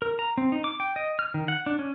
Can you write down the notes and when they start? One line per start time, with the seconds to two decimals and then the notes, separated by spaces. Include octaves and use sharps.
0.02 A#4
0.19 A#5
0.38 C4
0.52 D#4
0.64 D6
0.80 G5
0.96 D#5
1.19 F6
1.34 D#3
1.48 F#5
1.66 D4
1.79 C#4